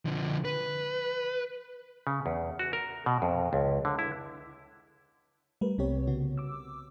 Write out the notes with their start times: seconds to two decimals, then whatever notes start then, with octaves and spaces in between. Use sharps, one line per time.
0.06 D3 F3
0.45 B4
2.07 C#3
2.26 E2
2.59 F#4
2.73 A#4
3.06 B2
3.22 F2
3.53 C#2
3.85 D3
3.99 E4
5.61 G3 A3 A#4 B4
5.78 C2 C3 B3 C4 G4 C#5
6.07 C#3 B3 F#4
6.38 D6 E6